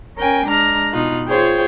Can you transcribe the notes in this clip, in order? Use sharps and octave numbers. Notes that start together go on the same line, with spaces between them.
C#4 A#4 G5 G#5
G#3 D4 A#5 F6 A#6
B2 D#4 F4 F#6
F4 G#4 C5 C#5 G5